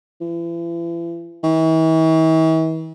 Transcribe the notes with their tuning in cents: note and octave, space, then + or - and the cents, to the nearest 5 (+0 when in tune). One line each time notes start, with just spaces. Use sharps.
E3 +40
E3 -45